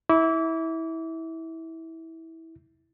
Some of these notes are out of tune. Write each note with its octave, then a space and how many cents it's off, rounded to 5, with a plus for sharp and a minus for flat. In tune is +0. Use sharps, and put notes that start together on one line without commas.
E4 -20 D6 -35